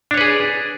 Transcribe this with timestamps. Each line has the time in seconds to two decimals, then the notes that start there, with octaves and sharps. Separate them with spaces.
0.11 D4
0.14 C#5
0.17 B4
0.21 G#4